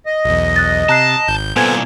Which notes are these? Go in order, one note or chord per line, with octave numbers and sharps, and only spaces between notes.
D#5
B1 E2
F#6 A6
C3 A5 A#5 F#6 C7
G#1 G6
C2 A#2 B3 A4 C5 G#5 G#6